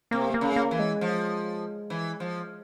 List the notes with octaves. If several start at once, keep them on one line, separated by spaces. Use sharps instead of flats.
C3 A#3
A#3
C#3
A#3
E3
G#3
F3
E3
F3